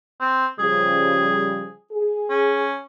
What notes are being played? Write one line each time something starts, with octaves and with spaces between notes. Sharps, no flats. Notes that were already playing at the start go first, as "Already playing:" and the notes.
C4
C#3 F3 G3 G#4
G#4
C#4